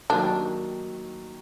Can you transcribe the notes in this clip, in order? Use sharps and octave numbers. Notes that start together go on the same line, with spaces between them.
D#3 F#3 A#3 D4 D#4 G4